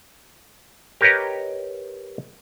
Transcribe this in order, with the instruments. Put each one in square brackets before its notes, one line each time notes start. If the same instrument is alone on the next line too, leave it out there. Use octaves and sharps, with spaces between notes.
[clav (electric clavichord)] G4 A#4 B4 C#5 D#5